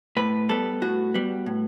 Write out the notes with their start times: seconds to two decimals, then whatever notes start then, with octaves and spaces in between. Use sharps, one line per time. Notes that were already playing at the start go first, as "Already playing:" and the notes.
0.17 A2 B4
0.49 G3 B3 A4
0.82 A2 F#4
1.14 G3 B3
1.46 A2